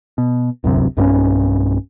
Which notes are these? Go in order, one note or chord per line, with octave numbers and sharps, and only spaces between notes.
B2
D1 C2 F#2 C3
B1 G2 C4 C#4